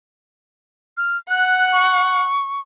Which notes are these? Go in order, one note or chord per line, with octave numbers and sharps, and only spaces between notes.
F6
F#5 F#6
C#6